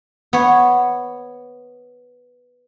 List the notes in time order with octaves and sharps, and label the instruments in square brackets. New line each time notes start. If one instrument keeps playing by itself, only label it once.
[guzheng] B3 C#5